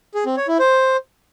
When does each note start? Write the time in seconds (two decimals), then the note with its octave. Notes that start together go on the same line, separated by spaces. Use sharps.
0.15 G#4
0.26 C4
0.37 C#5
0.48 E4
0.59 C5